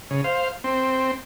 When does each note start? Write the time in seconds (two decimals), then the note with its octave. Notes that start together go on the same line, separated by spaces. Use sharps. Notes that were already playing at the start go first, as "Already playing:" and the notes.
0.11 C#3
0.24 C5 F5
0.64 C4